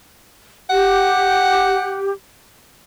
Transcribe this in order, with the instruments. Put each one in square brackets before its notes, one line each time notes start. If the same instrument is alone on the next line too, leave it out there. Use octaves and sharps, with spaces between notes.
[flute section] G4 [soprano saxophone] F#5